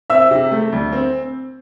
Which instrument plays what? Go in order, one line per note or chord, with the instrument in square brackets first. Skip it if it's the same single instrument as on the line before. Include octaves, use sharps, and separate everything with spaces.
[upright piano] C4 E5 E6
C3
A3
D2
C4